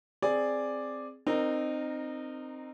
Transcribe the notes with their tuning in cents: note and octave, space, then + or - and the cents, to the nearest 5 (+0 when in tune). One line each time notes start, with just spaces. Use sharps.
C4 +0 G#4 +0 D5 +0
C4 +0 D#4 -25 A#4 +0